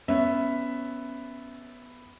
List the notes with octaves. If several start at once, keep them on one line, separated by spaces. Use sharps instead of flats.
B3 C#4 E5